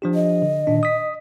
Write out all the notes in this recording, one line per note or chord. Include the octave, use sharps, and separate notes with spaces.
F3 D4 G4
D#5
D3
A#2 D#3 D4
D#6 B6